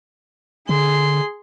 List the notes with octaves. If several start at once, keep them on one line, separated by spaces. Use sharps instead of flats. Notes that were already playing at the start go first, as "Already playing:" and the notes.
D3 G#4 C6